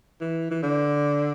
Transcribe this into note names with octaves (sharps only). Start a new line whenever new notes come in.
E3
E3
D3